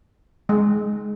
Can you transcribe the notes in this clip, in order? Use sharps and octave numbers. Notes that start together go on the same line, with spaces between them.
G#3